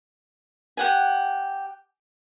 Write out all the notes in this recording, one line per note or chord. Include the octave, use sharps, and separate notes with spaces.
G4 F#5 G#5